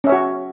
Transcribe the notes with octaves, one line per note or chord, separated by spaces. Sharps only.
C#4 F#4 C#5 E5